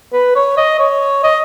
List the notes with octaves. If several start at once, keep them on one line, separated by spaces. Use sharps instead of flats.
B4
C#5
D#5
C#5
D#5